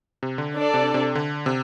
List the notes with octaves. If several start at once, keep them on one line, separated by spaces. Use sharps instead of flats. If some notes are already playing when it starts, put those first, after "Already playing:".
C3
D3
D4 A4 D5
C3
C3
D3
C3